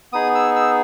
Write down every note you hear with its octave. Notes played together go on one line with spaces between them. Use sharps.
B3 D#4 G#4 D#6
E6
E6